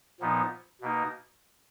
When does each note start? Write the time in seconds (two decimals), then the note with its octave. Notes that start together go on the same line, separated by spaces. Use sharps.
0.20 A#2 F3 B3 D#4
0.81 B2 A#3 D#4